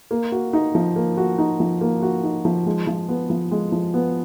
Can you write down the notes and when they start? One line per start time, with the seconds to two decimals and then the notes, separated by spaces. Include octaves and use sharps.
0.11 A#3
0.32 F#4
0.53 D#4
0.75 F3
0.96 A#3
1.17 F#4
1.38 D#4
1.60 F3
1.81 A#3
2.02 F#4
2.23 D#4
2.45 F3
2.66 G#3
2.87 F3
3.09 B3
3.30 F3
3.51 G#3
3.72 F3
3.94 B3